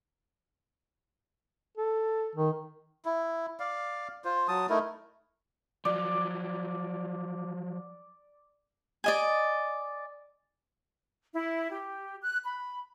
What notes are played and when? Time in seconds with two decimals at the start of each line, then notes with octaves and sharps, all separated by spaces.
1.78 A4
2.36 D#3
3.05 E4
3.60 D5 F5
4.25 F4 C5
4.48 F#3 A5 D#6
4.70 A3 D#4 E4 A#4
5.85 F3 F#3 D5
9.04 D5 D#5 G#5
11.34 E4
11.71 G4
12.22 F#6
12.44 B5